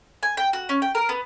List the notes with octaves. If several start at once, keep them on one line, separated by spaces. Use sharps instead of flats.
G#5
G5
F#4
C#4
G5
A#4
B3